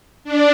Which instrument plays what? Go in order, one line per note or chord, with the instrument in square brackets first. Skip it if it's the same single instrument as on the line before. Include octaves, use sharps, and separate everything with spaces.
[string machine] D4